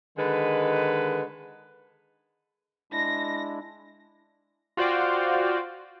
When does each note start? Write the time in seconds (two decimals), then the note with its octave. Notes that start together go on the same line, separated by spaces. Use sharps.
0.18 D3 D#3 G#3 B4
2.92 G#3 D4 E4 A#6
4.77 F4 F#4 C5 D5 F5 G5